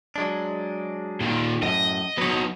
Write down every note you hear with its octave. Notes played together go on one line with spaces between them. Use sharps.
F#3 G#3 D4
A#2 D#3
F#2 A2 D#5
F#3 B3 D#4 C#5